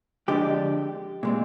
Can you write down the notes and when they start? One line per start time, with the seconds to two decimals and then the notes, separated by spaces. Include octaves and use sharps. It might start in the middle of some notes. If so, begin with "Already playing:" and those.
0.28 F2 D3 G#3 D4 G4
1.23 A#2 G#3 C4